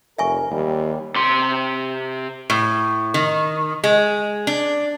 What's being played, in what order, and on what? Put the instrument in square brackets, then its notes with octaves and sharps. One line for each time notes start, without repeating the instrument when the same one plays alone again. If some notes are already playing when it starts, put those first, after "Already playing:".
[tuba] F1 [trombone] A#4 [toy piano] E5 G#5 C#6
[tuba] D#2 [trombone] G3
[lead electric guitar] C3 C6
[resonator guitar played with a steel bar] A2
D#3
G#3
D4